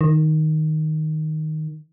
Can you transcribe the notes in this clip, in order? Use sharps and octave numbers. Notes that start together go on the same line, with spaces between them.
D#3